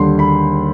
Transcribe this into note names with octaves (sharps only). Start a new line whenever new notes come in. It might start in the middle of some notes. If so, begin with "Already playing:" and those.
Already playing: D#2 D3 G3 C6
B5